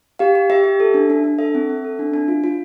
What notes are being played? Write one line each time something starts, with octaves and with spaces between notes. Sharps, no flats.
G4 F5
G4
G4 E5
G4
A4
D4
D4
D4
A4 E5
C4
C4
A4
D4
D4
F4
F4